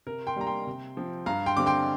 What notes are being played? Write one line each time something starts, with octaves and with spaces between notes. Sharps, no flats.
C3 A#4
G5 C6
G3 A#3 D4 A#5
G5 C6
C3
F3 C4
G2 F5 A#5
G5 C6
D3 G3 C4 D6
G5 C6